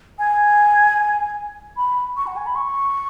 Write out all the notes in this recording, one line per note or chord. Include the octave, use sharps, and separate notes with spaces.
G#5
B5
C#6
F#5
G#5
B5
C#6